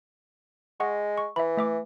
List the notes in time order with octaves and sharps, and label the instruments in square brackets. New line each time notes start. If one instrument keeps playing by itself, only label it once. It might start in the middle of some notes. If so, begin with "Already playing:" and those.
[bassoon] G#3 [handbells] D#5 F#5 C#6
[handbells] C#6
[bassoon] E3 [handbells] E5 B5
[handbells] A3 E5 D6